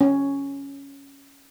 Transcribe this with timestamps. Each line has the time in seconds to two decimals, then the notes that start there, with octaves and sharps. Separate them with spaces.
0.01 C#4